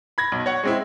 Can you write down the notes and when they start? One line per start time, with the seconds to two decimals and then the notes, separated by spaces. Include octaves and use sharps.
0.18 B5 G#6 A#6
0.32 B1
0.46 C#5 F#5
0.63 G#3 C4 E4